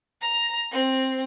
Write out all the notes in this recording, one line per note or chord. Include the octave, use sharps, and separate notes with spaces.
A#5
C4